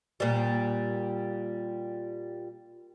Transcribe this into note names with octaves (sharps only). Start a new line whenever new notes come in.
A#2 G3